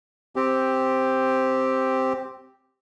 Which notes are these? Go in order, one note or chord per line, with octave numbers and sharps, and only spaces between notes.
C4 G4